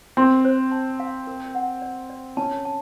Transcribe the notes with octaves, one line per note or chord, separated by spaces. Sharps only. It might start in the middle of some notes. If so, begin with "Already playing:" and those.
C4 C6
C5
A5
F5
A#4
F#5
D5
D5
C#4 A5
A5